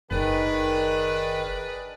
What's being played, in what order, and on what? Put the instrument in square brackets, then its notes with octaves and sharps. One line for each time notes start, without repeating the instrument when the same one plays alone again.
[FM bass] F#1 [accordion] D#3 [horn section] D4 G#4 B4